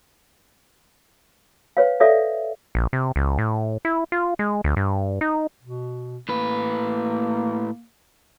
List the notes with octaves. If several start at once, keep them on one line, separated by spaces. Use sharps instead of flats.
B4 C#5 F5
A4 C#5 D5 E5 F5
A#1
C3
C#2
A2
E4
F4
G#3
D2
G2
D#4
B2
A2 A#3 B4